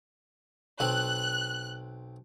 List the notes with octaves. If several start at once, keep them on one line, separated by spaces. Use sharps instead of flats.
B1 C4 F#6